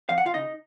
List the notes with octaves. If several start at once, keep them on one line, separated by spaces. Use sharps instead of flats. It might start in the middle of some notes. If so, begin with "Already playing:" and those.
F2 F5
F#5
F4 F5
C#3 D#4 D#5